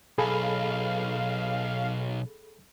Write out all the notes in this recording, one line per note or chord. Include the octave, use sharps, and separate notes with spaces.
B1 G#4 A4 F5 B5